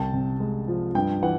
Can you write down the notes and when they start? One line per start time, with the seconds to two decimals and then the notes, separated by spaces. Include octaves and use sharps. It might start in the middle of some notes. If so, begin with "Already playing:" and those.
Already playing: C2 G5 A5
0.13 C3
0.40 G#3
0.68 F3
0.95 G2 G5
1.23 E3 F#5